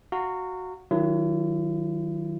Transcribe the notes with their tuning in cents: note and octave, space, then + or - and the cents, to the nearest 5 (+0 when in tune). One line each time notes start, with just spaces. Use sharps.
F#4 +0 F5 +0 A#5 -30
D#3 +0 F#3 +0 E4 +45